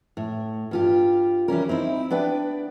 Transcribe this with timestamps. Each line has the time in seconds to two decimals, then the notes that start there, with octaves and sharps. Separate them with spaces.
0.17 A2
0.71 G2 F4 G4
1.48 E3 G3 C#4 A#4
1.69 C4 D#4 E4
2.10 B3 D4 B4 D5 G5